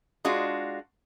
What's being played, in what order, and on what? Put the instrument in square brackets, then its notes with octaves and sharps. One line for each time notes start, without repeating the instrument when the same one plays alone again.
[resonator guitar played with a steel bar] G#3 D4 F4 F#4